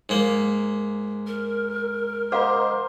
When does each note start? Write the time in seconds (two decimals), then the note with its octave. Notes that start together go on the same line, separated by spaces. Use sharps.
0.09 G#2 A#3
1.27 A#4
2.32 C5 D#5 F5 F#5 A#5 D6